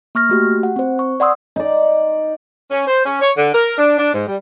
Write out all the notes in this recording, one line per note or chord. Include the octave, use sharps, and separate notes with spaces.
A#3 C#6 F6 A#6
A3 F#4 G4
F#5
C4 C5
C#6
D5 F#5 C6 D#6 E6
D#4 D5
C#4
C5
C#4
C#5
D3
A#4
D4
D4
G#2
G3